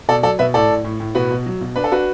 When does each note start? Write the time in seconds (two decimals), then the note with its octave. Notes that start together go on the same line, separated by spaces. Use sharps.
0.08 B2 A4 D5
0.23 F#3 A4 D5
0.39 B2 B4 E5
0.54 A2 A4 D5
0.69 A2
0.84 A2
1.00 A2
1.15 B2 F#4 B4
1.31 B2
1.46 F#3
1.61 B2
1.76 D4 B4
1.84 A4
1.91 D4 F#4 B4